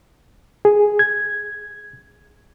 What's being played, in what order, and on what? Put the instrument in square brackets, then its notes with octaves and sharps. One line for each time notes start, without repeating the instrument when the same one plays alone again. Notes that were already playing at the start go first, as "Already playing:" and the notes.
[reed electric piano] G#4
G#6